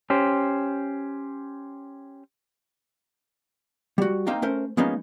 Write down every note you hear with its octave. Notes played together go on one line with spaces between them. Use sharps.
C#4 G4 C5
G3 F#4
A#3 C4 D#4 F5 G5 A#5
A3 C#4 A#4 C5
F3 G#3 A#3 B3 C#4 D#4